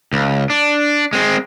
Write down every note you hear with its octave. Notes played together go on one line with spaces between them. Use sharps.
C#2
D4
G#3 C4